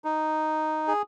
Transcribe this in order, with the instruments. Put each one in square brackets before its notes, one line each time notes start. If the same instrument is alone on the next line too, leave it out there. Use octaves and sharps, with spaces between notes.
[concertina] D#4
G#4